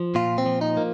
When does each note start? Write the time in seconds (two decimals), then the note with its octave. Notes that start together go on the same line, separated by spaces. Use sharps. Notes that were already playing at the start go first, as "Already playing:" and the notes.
Already playing: F3
0.15 A#2 F4
0.38 C4
0.46 F3
0.61 D#4
0.77 A#3